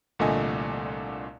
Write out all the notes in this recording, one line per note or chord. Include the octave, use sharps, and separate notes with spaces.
C2 A#2 D3 A3 D#5 G#5